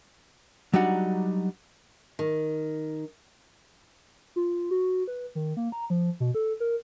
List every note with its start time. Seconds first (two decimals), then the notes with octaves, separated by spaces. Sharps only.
0.74 F#3 G3 D4 D#4 F#4 F#5
2.19 D#3
4.36 F4
4.71 F#4
5.07 B4
5.35 D#3
5.57 A#3
5.72 A#5
5.90 F3
6.20 B2
6.35 A4
6.60 A#4